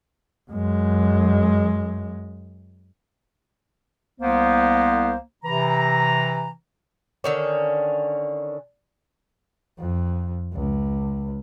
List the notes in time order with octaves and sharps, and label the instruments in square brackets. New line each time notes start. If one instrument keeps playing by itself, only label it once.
[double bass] F#2 G#3
[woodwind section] C2 A#3 B3 C5
C3 E3 A#5
[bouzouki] D3 D#3 C#4
[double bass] F2
C#2